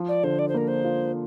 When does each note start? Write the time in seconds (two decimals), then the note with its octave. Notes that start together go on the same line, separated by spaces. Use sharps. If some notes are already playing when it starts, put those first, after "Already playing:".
Already playing: F3
0.08 D5
0.23 D3 C5
0.39 D5
0.48 C5
0.54 A#3 A#4
0.68 C5
0.84 F4